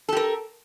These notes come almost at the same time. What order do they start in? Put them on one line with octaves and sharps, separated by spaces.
A4 G4 A#4